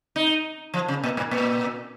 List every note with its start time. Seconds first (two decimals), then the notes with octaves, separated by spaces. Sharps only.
0.16 D#4
0.74 F3
0.88 C#3
1.04 A#2
1.17 G#2
1.31 A#2